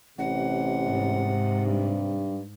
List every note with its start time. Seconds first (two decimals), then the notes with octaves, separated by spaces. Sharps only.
0.18 A1 C3 F#5
0.86 G#2
1.67 G2